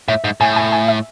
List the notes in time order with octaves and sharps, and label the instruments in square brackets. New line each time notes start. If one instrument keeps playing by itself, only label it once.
[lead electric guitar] A2 [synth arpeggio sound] E5
[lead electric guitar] G#2
[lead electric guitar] A2 [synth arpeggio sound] G#5
[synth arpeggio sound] G#5
G#5
E5